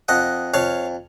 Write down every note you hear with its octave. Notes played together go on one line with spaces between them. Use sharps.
F2 D#5 F#5
F2 C#5 F5